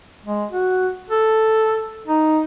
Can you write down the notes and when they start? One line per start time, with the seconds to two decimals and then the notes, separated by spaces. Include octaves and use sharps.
0.25 G#3
0.51 F#4
1.10 A4
2.07 D#4